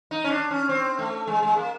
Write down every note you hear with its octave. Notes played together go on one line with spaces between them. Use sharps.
D#4
C#4
D4
C#4
C4
A3
G#3
G#3
A#3